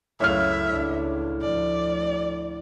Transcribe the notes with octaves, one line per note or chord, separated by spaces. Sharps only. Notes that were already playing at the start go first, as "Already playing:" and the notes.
C#2 F#2 A2 C#5 E5 F5 F6
C#2 D4
D2 F3 D5